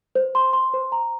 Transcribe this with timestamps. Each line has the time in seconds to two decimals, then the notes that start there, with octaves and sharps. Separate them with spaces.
0.15 C5
0.35 C6
0.53 C6
0.74 C5
0.92 A#5